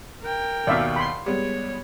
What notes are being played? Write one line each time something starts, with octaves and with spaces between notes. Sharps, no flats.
A#4 G5
D#2 B2 D5 E5 F5
B5 C6
G3 G#3 B3 C#5